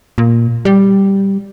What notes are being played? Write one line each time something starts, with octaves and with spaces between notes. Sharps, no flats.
A#2
G3